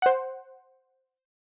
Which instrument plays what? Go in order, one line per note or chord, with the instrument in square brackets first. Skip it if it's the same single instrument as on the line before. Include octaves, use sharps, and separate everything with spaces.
[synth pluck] C5 F#5